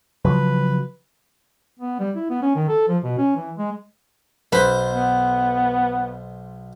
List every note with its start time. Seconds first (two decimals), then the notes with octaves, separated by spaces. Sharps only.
0.25 C#3 F3 F#3 B4
1.79 B3
1.99 G3
2.16 E4
2.30 B3
2.42 C#4
2.55 D#3
2.68 A4
2.88 F3
3.04 B2
3.17 C#4
3.36 E3
3.58 G#3
4.52 B1 B4 C5
4.93 B3